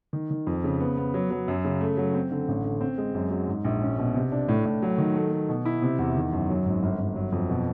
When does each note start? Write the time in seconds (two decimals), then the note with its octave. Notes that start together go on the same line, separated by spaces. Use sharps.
0.13 D#3
0.31 D#3
0.47 F2
0.64 C#3
0.80 B3
0.97 B3
1.14 F#3
1.31 F#3
1.48 F#2
1.65 C#3
1.81 A3
1.97 F#3
2.14 C4
2.31 D3
2.48 A1
2.64 D3
2.81 C4
2.98 G#3
3.14 F#2
3.31 F#3
3.47 G#2
3.65 A#1
3.81 C#4
3.98 B2
4.15 C3
4.32 D4
4.48 A2
4.65 A2
4.82 F#3
4.98 D#3
5.15 A3
5.32 A3
5.49 B2
5.65 E4
5.82 C3
5.99 E2
6.16 D#3
6.32 F#2
6.50 F#3
6.66 G#1
6.83 G1
6.99 G1
7.16 F#3
7.32 F2
7.50 B2